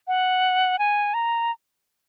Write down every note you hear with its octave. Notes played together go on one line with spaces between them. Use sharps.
F#5
G#5
A#5